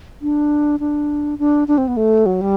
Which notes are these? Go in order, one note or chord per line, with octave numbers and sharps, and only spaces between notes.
D4
D4
D4
D4
C4
B3
A3
F#3
G3